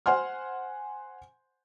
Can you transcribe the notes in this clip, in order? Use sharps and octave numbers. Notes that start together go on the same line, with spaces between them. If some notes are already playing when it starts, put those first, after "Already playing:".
C5 F#5 G#5 C6 F6